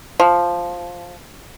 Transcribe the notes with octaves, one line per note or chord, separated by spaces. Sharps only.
F3